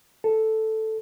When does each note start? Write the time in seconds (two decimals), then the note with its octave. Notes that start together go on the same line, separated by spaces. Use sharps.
0.24 A4